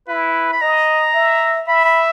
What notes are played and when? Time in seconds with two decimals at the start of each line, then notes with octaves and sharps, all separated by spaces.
0.08 E4 B4
0.53 B5
0.62 D#5 A#5
1.15 E5
1.68 E5 B5
1.85 B5